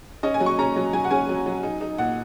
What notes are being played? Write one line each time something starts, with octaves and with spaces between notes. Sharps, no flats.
C#4 D#5
G#5
F#3
C#6
C#4 A#5
F#3
F#3 G#5
F#5
C#4 G#5
F#3
F#3
D#4
D#4
A#2 F#5